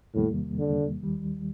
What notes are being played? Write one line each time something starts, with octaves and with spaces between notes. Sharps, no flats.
E2 A2 C3 D#3 G3 A#3
D3
D#2 D#3 G3